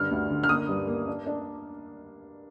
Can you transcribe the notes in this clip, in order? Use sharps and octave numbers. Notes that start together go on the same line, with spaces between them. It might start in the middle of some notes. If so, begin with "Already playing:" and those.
Already playing: G2 D3 F6
D2
D3
F6
A#3 D#6
G2
A#3
D4
D4